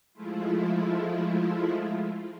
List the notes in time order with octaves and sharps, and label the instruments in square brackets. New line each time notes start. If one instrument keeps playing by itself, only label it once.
[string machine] F3 G#3 A3 E4 F4